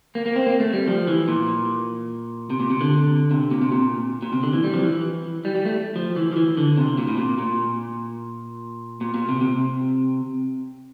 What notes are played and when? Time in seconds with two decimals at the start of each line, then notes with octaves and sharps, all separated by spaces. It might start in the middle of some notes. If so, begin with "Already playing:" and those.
0.15 A#3
0.26 A#3
0.36 C4
0.47 A#3
0.60 A3
0.73 G3
0.88 F3
1.08 E3
1.28 A#2
2.50 C3
2.60 A#2
2.70 C3
2.81 D3
3.31 C3
3.51 A#2
3.61 C3
3.72 A#2
4.22 A#2
4.33 C3
4.43 D3
4.53 E3
4.64 G3
4.74 F3
4.84 E3
5.45 G3
5.55 G3
5.66 A3
5.96 F3
6.16 E3
6.32 F3
6.37 E3
6.57 D3
6.78 C3
6.98 A#2
7.08 A2
7.17 A#2
7.38 A#2
9.01 A#2
9.14 A#2
9.29 C3
9.41 C3